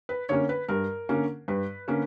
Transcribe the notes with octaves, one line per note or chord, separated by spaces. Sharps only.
B4
D3 A#3 C#4 C#5
B4
G2 A#4
D3 A#3 C#4
G2 B4
D3 A#3 C#4